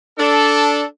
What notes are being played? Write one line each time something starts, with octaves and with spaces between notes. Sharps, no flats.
D4 A4